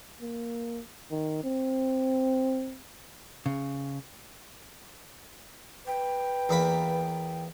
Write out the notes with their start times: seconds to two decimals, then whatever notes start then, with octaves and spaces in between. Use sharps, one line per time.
0.21 A#3
1.11 D#3
1.44 C4
3.46 C#3
5.87 B4 G5
6.49 E2 A#3 B5